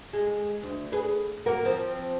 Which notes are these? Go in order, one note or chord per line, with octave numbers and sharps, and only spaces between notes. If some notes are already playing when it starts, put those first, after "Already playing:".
G#3
D2
G#4 B4
A#3 F#4 A#4
F3 C4